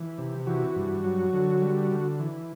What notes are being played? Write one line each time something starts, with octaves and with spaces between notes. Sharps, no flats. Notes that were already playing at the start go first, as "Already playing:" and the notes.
Already playing: E3
C3
E3 F#4
G2
F#3
D3
G3
D3
E3